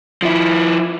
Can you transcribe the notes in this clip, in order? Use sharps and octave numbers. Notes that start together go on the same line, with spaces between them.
F3 E4